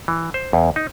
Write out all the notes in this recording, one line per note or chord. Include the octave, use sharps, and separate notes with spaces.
E3
C5
E2
D#4